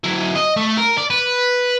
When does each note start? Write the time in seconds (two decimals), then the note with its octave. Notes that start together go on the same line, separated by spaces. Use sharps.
0.04 F#3 E4
0.35 D#5
0.56 A3
0.77 A#4
0.98 D5
1.10 B4